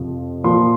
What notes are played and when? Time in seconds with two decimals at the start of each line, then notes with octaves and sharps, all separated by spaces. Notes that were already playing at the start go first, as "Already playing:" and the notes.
Already playing: F2 C3 F3
0.44 A#2 F3 C6